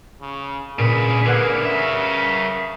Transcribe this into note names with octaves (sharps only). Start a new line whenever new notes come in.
C#3
A#2 C#3 G#4 B4
D3 A#3 B4 F#5 G#6
C#3 A#4 E5